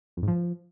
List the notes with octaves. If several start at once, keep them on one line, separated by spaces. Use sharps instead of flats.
F2
G#2
F3